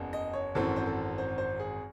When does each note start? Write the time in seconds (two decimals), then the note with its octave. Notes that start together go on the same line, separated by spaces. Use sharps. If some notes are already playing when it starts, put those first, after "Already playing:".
Already playing: F#1 E2 C#3
0.13 D#5
0.33 C#5
0.55 G#1 F#2 E3 C4 A4
0.76 C5
0.86 A4
1.18 C5
1.38 C5
1.60 G#4